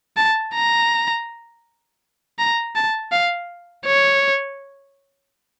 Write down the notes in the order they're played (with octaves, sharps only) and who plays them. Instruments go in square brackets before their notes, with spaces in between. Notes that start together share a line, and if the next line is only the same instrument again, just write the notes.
[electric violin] A5
A#5
A#5
A5
F5
C#5